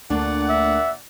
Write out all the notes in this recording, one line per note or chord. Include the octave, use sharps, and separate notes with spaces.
D2 A#2 A3 A#3 D4 D5 F#5
E5